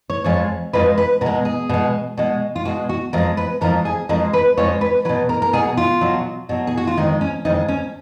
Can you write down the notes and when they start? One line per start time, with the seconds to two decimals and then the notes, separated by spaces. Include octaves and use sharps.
0.10 C#5
0.24 F2 F3 G#3 C#5
0.73 F2 F3 G#3 B4
0.98 B4
1.21 B2 A#4
1.26 G#3
1.45 G#4
1.69 B2 G#3
2.17 B2 G#3
2.56 F4
2.65 B2 G#3 F#4
2.89 F#4
3.13 F2 F3 G#3 A#4
3.37 B4
3.61 F2 F3 G#3 A#4
3.85 G#4
4.09 F2 F3 G#3 A#4
4.33 B4
4.57 F2 F3 G#3 C#5
4.81 B4
5.05 F#3 B4
5.09 B2
5.29 A#4
5.42 A#4
5.53 B2 F#3 G#4
5.77 F4
6.01 B2 F#3
6.49 B2 F#3
6.67 G#4
6.77 F#4
6.87 F4
6.97 F2 D#3 G#3 D#4
7.21 C#4
7.45 F2 D#3 G#3 D#4
7.68 C#4